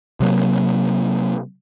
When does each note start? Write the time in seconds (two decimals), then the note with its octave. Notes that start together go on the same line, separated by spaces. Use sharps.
0.20 C3 F#3 A#3